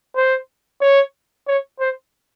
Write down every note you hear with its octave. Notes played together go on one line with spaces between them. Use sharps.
C5
C#5
C#5
C5